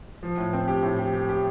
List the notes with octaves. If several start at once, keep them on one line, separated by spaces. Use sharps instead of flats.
F3
A2
C4
G4
A2
G4
G4
G4